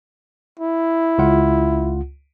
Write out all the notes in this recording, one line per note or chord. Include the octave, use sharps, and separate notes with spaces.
E4
C#2 F4 F#5